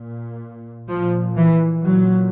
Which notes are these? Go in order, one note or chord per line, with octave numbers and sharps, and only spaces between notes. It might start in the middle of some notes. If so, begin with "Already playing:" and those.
Already playing: A#2
A#2 F3
E3
A#2 F#3